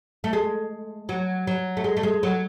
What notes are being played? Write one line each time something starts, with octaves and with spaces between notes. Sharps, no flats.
A3
G#3
F#3
F#3
A3
G#3
A3
G#3
F#3